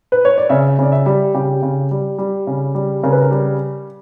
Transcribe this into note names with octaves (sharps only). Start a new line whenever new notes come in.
B4
C#5
D5
C#3 E5
C#3 D5
E5
G3
C#3 G4
C#3
G3
G3
C#3
G3
C#3 A#4
B4
A#4
G3